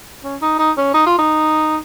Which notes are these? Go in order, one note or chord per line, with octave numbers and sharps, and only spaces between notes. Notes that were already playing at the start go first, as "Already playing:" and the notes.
C#4
D#4
D#4
C#4
D#4
F4
D#4